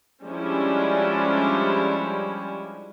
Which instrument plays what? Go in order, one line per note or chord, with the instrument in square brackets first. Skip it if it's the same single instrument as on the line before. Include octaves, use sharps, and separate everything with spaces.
[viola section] F3 G3 G#3 C#4 D4 E4